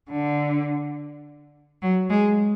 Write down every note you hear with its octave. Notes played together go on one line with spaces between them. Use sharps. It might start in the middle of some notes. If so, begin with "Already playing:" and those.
D3
F#3
G#3